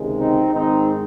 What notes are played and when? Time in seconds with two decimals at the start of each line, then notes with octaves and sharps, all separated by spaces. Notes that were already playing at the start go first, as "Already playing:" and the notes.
Already playing: C#2 C3 D#3 G#3
0.19 C4 D#4
0.53 G#2 D#3 G#3 C4 D#4